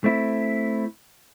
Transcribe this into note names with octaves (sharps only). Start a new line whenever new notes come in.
A3 C4 E4